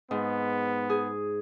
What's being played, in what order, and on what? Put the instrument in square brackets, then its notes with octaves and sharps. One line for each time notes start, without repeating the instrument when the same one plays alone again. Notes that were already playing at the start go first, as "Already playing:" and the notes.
[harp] G#2 [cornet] B3
[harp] G#4